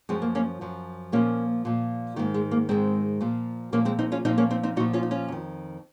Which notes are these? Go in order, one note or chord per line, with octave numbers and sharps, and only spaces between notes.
F#2 F3 G#3 C4
A#3
A#3 C#4
F#2 F3
A#2 F3 A#3 C#4
A#2 F3
G#2 D#3 A#3
G#3
A#3
G#2 D#3 G#3 C4
A#2 F3
A#2 F3 A#3 C#4
G#3 C4
C4 D#4
C#4 F4
A#2 F3 C4 D#4
A#3 C#4
C4 D#4
C4 D#4
A#2 F3 D#4 F#4
C#4 F4
D#4
C#4 F4
F2 D#3